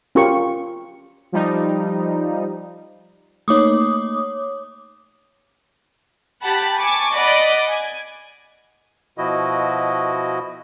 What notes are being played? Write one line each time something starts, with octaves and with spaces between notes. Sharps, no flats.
C#4 F4 G4 A#4 C#6
F3 G3 D#4
A3 A#3 D#4 C#5 D6 D#6
G4 F#5 A5 B5
G#5 A5 C#6 D6
D5 D#5 F#5 B5 D6
G#5
B2 F3 E4 F#4 D#5